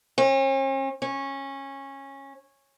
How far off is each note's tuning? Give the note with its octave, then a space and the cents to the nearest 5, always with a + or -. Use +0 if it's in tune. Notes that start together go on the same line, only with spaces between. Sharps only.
C#4 -45
C#4 -15